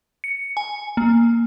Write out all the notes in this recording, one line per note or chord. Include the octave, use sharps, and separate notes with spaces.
C#7
G#5
A#3